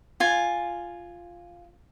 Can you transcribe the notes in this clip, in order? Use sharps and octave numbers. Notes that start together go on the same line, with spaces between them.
F4 G#5